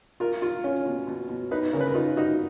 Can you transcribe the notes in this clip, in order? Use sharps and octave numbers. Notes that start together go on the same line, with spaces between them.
F4 A#4
F4
C#4
B2
B2
B2
D#4 B4
C#3 A#4
B4
A#4
D#4 F4
D#4 F#4